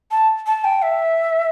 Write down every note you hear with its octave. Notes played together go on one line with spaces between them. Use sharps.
A5
A5
G5
E5